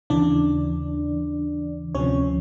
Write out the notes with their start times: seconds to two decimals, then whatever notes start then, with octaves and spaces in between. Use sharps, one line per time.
0.10 D#2 C#3 E3 D4 D5
1.95 D2 C3 F3 C#4 C#5